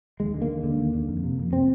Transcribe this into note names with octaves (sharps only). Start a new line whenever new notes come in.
D#2 G#3
D3
A#3
D#2
D3
D#2
D3
F2
C3
F2
C3 C4